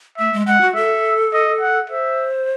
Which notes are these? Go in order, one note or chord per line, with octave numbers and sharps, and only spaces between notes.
A3 E5
G#3
G#3 F#5
F#4
A4 E5
D#5
F#5
C5 E5